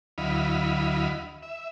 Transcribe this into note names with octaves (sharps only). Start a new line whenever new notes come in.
D2 F#3 E4 D#5 F5 B5
E5